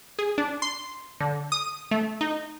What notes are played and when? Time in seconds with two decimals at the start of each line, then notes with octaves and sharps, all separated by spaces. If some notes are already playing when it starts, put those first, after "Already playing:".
0.19 G#4
0.38 D4
0.62 C6
1.20 D3
1.52 D#6
1.91 A3
2.21 D#4